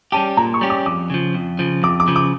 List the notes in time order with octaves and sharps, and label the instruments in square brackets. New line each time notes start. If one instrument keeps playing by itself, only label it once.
[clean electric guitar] G3 C#4 G4 [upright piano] A5
[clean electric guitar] A#2 [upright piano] A#5
[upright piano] C#6
[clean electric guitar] G3 C#4 G4
[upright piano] D6
[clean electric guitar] F2 [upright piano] D6
[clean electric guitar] C#3 F3
F2
C#3 F3
[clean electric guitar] F2 [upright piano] D6
[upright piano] D6
[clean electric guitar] C#3 F3
[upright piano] D6